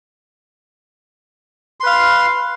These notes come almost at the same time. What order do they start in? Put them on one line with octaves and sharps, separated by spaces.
C6 B4 F5